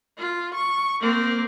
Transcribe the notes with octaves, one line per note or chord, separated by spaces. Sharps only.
F4
C#6
A#3 C4